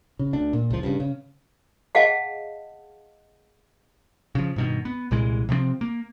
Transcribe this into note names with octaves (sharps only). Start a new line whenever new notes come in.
C#3
D2 D4
A#2
C#2 F3
G2 C#3
C#3
G#4 D#5 F5 F#5 A5
C#3 F3
G2 B2 D#3
B3
C2 A#2 E3 G#3
C3 F3 G#3 C4
A#3